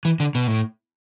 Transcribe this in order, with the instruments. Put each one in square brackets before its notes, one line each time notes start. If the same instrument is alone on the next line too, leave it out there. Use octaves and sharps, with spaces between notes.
[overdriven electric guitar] E3
D3
B2
A2